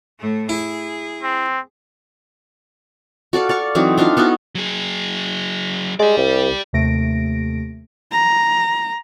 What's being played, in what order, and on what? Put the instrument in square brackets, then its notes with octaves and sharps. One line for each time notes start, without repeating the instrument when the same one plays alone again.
[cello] A2 A3
[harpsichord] E4 [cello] G#4
[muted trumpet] C4
[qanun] F#4 A4 D5 F5
D5 F5 C#6
E3 F#3 C4 D#4
D4 D#4 F4 F5
B3 D#4 E4 F#4
[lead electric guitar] F#3 G#4
[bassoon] G#3 [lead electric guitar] G4 D5
[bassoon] C2
[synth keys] D#2 C3 A3 A#6 D7
[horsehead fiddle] A#5